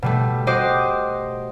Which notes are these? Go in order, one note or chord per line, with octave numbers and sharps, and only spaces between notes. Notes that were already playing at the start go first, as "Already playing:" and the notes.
B2 G3 A3
F#4 G4 C5 D#5 D6